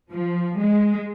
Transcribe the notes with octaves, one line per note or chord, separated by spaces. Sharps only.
F3
G#3